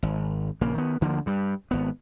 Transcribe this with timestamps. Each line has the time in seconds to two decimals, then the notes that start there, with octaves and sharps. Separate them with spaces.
0.03 G#1
0.61 A#1 C#3 A#3
0.74 D#3 B3
1.01 D2 D3 F3 A#3
1.26 G2 G3
1.71 G#1 B3